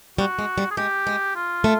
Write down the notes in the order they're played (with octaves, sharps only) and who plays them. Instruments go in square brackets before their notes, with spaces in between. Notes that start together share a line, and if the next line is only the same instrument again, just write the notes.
[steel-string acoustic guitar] G3 [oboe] F#4
[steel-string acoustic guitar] G#3
G3
[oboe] G#4
[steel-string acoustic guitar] G#3 [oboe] G4
[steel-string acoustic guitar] G#3
[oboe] F4
[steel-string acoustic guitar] A3